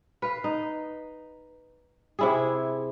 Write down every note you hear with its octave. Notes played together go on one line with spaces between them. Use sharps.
B4 F5
D#4
C3 E4 G#4